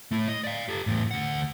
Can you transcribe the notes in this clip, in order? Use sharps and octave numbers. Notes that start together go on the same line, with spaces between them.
A3 E4
D#5
D5 F5
G4 A4
E2 A2
D2 F#5